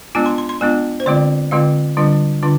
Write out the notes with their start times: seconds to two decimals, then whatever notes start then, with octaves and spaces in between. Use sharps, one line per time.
0.15 G#3 B3 D4 F4 G#5
0.26 C6
0.38 C6
0.49 C6
0.61 G#3 B3 D4 F4 G#5
1.00 C5
1.06 D3 G#3 C4 F4 D5
1.51 D3 G#3 C4 F4 F5
1.97 D3 G3 D4 F4
2.43 D3 D4 F4